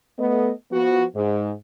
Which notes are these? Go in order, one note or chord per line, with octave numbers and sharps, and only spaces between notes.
A3 B3 D#5
F3 B3 F#4
G#2